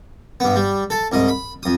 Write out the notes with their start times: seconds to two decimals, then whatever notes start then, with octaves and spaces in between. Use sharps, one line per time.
0.40 G2 B3
0.56 G3
0.90 A4 A5
1.12 C2 G#2 D#5
1.29 B5
1.63 F2 D#6